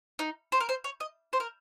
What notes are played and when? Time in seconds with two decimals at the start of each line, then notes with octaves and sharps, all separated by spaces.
0.19 D#4
0.52 C5
0.60 A#4
0.69 C5
0.84 C#5
1.00 D#5
1.33 C5
1.40 A#4